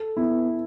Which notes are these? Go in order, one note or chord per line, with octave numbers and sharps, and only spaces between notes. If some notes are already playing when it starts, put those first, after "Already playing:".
Already playing: A4
B3 E4